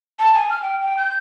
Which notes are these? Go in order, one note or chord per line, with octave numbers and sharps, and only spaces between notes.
A5
G#5
F6
G5
G5
G6